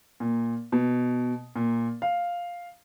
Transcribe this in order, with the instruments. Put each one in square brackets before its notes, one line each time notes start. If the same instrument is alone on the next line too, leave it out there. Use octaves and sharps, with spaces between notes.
[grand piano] A#2
B2
A#2
F5